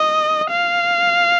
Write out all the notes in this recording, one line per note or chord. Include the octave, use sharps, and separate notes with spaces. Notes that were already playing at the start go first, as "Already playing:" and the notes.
Already playing: D#5
F5